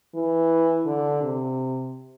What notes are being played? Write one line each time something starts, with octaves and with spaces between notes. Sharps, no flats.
E3
D3
C3